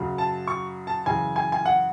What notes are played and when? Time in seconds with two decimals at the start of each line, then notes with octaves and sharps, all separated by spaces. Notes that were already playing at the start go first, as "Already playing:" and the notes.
Already playing: F#2 C#3 F#3
0.18 A5
0.47 C#6
0.87 A5
1.06 F#2 C#3 E3 G#5
1.36 G#5
1.52 G#5
1.65 F#5